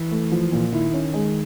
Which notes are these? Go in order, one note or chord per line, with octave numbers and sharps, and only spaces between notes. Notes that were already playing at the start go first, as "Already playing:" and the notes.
Already playing: E3
A3
F3
A#2
D#3 E4
C#4
G#3